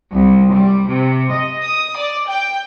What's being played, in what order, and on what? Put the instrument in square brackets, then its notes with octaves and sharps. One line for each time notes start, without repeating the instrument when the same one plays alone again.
[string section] C2
G3
C3
D#5
D#6
D5
G5